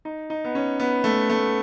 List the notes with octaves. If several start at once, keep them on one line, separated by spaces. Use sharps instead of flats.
D#4
D#4
B3
C#4
B3
A3
A3